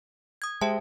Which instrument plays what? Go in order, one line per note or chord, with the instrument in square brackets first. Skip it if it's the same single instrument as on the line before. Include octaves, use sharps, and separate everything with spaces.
[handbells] D#6 G#6
[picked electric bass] G#3 [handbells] G4 A5 [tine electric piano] C5 E5 G5